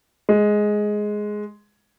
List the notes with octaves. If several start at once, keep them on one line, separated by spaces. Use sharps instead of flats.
G#3